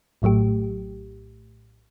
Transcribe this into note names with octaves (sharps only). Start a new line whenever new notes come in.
A#1 A2 F#3 A3 G4